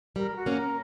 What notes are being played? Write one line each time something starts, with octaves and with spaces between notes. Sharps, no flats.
G3 A#4
F#4
A#3 C#4
A#4